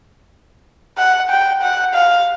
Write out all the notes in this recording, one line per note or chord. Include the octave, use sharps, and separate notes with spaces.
F#5
G5
F#5
F5